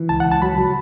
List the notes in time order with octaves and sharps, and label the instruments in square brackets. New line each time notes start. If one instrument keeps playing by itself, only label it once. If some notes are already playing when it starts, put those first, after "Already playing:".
Already playing: [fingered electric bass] E3
[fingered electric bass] C#2 [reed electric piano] A5
[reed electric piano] F#5
[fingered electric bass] C#2
[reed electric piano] A5
[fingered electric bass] F#3 [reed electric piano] B5
[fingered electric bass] F#3